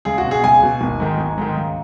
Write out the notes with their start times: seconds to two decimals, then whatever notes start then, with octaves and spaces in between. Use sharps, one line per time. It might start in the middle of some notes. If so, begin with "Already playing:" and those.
0.05 C#2 G#4
0.18 F#4
0.24 B2
0.31 G#4
0.43 C#2 G#5
0.62 B2
0.81 G#1
1.00 G#2 D#3
1.18 G#1
1.38 G#2 D#3
1.56 C#2